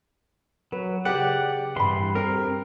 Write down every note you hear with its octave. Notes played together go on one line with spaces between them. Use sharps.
F#3 B4
C#3 G4 G#4 B4 D5 F#5
G2 E3 B4 E5 B5 C6
C4 G4 A#4